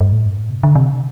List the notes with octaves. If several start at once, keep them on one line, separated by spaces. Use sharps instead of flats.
G2
A2
G2
A2
C3
D3
C3